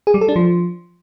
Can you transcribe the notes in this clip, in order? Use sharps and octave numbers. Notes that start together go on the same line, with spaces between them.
G#4
G3
A4
D4
F3